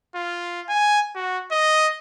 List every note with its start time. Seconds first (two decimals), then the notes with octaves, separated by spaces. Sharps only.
0.15 F4
0.69 G#5
1.16 F#4
1.52 D#5